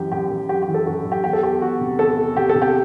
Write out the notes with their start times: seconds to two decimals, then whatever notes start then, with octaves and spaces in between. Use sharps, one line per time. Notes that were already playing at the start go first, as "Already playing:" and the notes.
Already playing: F#2 E3 G4
0.12 F#2 G4
0.31 F#2
0.49 F#2 G4
0.62 G4
0.68 E3
0.74 A4
0.86 F#2 F#4
1.05 F#2
1.12 G4
1.24 E2 G4
1.33 A4
1.43 E2 G4
1.61 E2 F#4
1.80 C3
1.99 E2 A4
2.18 E2
2.37 C3 G4
2.49 A4
2.55 C3
2.62 G4